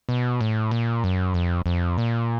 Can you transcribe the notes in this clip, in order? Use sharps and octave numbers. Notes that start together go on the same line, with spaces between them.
B2
A2
A#2
F#2
F2
F2
A#2